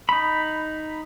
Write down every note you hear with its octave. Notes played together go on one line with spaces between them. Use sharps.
D#4 B5